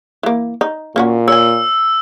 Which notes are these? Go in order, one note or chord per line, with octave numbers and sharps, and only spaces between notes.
E3 A#3
D#4
A#2 A#3 C#4 F#4
C#5 G#5 E6